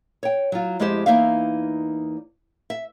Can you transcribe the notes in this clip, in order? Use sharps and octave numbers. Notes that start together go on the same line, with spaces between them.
C#5 G5
F#3 F4
F2 G#3 E4 G4 G#4 C5
E2 A#3 D#4 E5 F5
E5